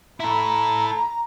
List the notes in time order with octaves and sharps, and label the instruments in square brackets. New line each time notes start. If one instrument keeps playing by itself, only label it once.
[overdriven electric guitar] E4 A4 [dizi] A#5 [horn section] B5